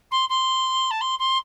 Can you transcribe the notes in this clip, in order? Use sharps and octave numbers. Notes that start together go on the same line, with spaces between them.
C6
C6
A5
C6
C6